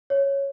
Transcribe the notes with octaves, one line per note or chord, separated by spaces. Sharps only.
C#5